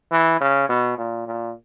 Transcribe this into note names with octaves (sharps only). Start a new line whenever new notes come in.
E3
C#3
B2
A#2
A#2